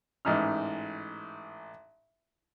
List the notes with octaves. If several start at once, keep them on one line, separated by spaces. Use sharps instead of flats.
A1 G#2 D#4 F6